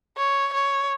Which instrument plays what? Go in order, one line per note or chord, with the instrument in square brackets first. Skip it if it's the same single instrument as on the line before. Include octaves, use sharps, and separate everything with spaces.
[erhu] C#5
C#5